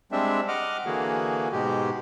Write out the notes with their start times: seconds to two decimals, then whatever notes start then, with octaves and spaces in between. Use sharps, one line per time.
0.12 G3 G#3 C4 D4 E5
0.48 D#5 F#5 D6 F6
0.86 D3 E3 A#3 F#4 G#4
1.52 G#2 B2 G#3 G4